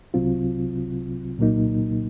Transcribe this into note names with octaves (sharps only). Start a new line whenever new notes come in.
C2 C3 F#3 C4 F4
C2 A#2 F#3 A#3 D#4